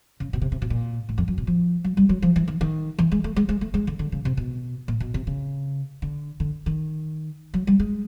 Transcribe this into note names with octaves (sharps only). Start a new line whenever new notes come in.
C#3
B2
C3
C3
B2
A#2
A2
F2
F#2
B2
F3
F#3
G3
F#3
F3
E3
D#3
D#3
E3
G#3
A3
G#3
G#3
A3
G#3
D3
D3
C#3
C3
B2
A#2
B2
C3
C#3
D3
D3
D#3
F#3
G3
G#3